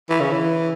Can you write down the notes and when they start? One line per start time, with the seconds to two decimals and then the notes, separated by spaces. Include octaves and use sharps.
0.10 E3
0.20 C#3
0.32 E3